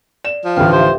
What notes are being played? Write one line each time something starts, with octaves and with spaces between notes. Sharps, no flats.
D5 E7
F3
A1 D2 B4 F5 G5
G4 C5 E5 F5